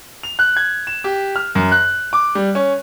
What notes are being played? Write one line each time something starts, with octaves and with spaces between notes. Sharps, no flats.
F7
F#6
G#6
E7
G4
F6
F#2
F#6
D6
G3
C#4